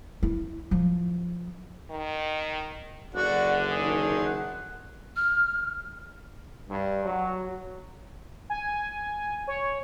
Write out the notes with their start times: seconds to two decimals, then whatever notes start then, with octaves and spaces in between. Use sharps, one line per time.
0.23 E4
0.71 F3
1.90 D#3
3.15 F#1 D3 F#4 D5 F#5
3.71 D#3 G#4
4.26 F#5
5.16 F6
6.68 G2
7.05 F#3
8.50 G#5
9.47 C#5